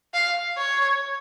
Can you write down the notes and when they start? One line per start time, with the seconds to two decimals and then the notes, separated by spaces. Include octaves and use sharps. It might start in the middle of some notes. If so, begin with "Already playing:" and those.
0.14 F5
0.58 C#5